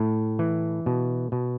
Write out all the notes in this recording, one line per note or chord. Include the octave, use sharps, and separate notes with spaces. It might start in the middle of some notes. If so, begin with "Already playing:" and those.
Already playing: A2
E3
B2
B2